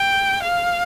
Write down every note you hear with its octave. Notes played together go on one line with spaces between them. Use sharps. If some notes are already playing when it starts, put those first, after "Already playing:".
Already playing: G5
F5